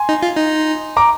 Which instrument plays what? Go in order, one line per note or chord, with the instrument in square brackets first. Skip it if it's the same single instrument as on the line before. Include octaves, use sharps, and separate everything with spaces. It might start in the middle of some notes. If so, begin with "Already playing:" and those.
Already playing: [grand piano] G#5 C6
[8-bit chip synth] D#4
F4
D#4
[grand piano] A#5 D6